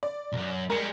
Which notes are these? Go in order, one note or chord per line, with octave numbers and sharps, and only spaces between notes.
D5
C2 F#2
G3 G#3 A#4 C#7